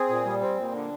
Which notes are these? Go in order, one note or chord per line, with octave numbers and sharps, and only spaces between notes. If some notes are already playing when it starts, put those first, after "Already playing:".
Already playing: C4 G#4
A#2
G3
C4
A#2
D3